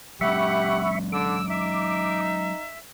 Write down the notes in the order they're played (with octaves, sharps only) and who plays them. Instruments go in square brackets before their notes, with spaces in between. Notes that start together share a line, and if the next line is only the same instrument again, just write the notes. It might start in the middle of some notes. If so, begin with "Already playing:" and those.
[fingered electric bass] F#3 G#3 C#4 [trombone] G4 [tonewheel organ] E5 B5 C#6 [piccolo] F#5
[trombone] D3 [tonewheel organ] D6 [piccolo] E6
[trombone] D#4 [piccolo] E5